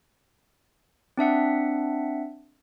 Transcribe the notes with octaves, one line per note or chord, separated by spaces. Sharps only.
C4 D4 E5 F#5